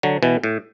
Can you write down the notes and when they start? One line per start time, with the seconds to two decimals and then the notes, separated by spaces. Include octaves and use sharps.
0.03 D3 F#3
0.23 B2 E3
0.44 A2